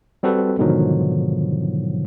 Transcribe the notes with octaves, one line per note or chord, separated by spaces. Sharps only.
G3 C4 F#4 A4 B4
G#2 B2 D3 D#3 F3 F#3